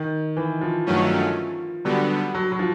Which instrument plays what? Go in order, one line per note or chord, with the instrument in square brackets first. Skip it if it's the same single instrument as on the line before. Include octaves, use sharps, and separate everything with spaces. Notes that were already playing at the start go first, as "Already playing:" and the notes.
Already playing: [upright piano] D#3
E3
F3
[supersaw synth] G2 D#3 F#3 A3 C#4
[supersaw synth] D3 G3 B3 [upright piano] F#3
[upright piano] F#3
F#3
F3